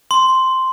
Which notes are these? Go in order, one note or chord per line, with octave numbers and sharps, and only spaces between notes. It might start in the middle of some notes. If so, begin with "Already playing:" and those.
C6